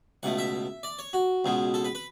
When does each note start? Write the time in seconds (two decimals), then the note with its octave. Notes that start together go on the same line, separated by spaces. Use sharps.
0.23 C#2 B2 A3 F#5
0.38 E5
0.83 D5
0.99 C#5
1.13 F#4
1.44 C#2 B2 G#3
1.74 A4
1.84 B4
1.95 B4